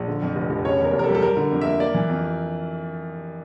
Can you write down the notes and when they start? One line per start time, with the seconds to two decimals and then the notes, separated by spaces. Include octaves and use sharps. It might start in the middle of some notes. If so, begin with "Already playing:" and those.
Already playing: A#1
0.08 D3
0.22 F2
0.36 F1
0.50 F1
0.64 C#3 C#5
0.79 E2
0.84 A#4
0.93 F1
0.99 A#4
1.04 A4
1.09 G3
1.15 A4
1.22 G3 A#4
1.37 D3
1.51 F2
1.61 A#3 E5
1.80 A#3 D5
1.94 E3
2.09 F2